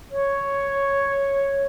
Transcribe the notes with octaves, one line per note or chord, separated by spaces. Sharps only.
C#5